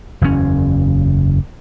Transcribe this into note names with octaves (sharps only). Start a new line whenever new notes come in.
F#1 E2 G#2 C#4